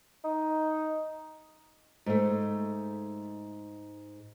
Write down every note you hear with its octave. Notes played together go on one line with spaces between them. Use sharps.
D#4
G#2 A3